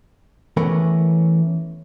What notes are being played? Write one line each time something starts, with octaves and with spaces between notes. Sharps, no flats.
E3 A3 B3 C#4 A#4 B4